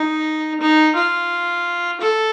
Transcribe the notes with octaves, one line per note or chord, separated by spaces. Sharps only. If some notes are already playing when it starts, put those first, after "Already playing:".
Already playing: D#4
D#4
F4
A4